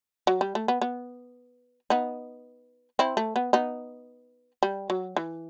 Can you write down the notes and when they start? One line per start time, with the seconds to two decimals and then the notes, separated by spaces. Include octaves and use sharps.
0.27 F#3
0.41 G3
0.55 A3
0.68 B3
0.81 B3
1.90 B3 D#4
2.99 C4 E4
3.17 A3
3.36 B3
3.53 B3 D#4
4.63 G3
4.90 F#3
5.17 E3